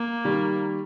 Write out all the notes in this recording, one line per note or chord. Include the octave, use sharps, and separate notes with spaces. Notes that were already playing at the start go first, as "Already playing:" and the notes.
Already playing: A#3
D#3 G3